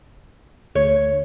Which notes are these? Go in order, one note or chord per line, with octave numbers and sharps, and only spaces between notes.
D2 C#5